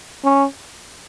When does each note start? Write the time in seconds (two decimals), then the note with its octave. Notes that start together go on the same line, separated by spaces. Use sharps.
0.24 C#4